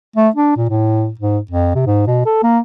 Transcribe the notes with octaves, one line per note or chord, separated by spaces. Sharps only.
A3
D4
A#2
A2
G#2
F2
C3
G#2
B2
A4
A#3